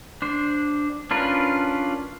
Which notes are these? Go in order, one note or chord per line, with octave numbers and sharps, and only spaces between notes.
D4 C5
C#4 D4 F4 A#4 B4